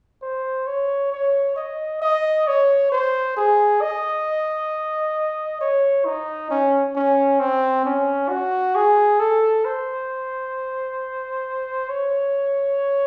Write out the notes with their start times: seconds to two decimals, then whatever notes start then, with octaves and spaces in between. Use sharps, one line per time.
0.22 C5
0.67 C#5
1.12 C#5
1.56 D#5
2.02 D#5
2.47 C#5
2.92 C5
3.37 G#4
3.81 D#5
5.61 C#5
6.05 D#4
6.50 C#4
6.96 C#4
7.40 C4
7.85 C#4
8.29 F#4
8.75 G#4
9.20 A4
9.65 C5
11.89 C#5